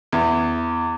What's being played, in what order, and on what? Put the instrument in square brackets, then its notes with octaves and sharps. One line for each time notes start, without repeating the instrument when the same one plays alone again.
[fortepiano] E2